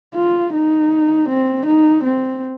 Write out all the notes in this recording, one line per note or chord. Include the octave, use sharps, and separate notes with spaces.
F4
D#4
C4
D#4
C4